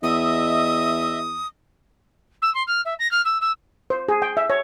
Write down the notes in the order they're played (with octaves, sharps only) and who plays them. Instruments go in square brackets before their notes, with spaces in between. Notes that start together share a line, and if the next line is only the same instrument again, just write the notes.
[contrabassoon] E2 [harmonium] D#5 E5 [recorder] D#6
[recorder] E6
C6
F6
E5
A#6
F6
E6
E6
[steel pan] C5
G#4
G5
E5
C#5